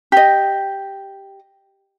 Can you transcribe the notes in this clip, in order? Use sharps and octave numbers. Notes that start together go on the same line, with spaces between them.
G4 D#5